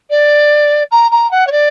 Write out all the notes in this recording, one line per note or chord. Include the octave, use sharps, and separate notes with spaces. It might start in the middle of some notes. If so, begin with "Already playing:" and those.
D5
A#5
A#5
F#5
C#5
D5